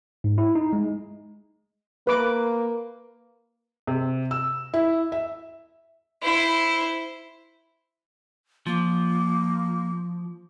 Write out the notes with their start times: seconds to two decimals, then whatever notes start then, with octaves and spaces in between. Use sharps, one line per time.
0.24 G#2
0.38 E4
0.55 D#4
0.73 G#3
2.07 A#3 B4 D6
3.87 C3
4.31 E6
4.74 E4
5.12 E5
6.22 E4 C5
8.67 F3 A#3